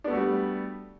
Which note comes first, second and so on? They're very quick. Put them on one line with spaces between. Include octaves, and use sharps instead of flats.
D4 B3 A3 F#4 G3